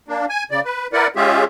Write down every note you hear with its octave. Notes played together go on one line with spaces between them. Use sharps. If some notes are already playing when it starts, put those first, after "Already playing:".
A#3 D4
G#5
C#3 D5
B4
E4 A#4 B4 D5 F#5
G#3 C#4 F4 G4 G#4 E5